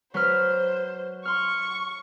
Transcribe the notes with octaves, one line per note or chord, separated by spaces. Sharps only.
F#3 B4 C5 F6
C6 C#6 F6